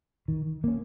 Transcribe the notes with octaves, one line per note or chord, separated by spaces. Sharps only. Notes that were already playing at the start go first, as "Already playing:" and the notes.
D#3
A#3 C#4